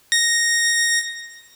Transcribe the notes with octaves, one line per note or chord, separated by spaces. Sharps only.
A#6